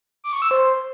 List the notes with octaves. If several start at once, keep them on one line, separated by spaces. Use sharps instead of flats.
D6
C#6
E6
C5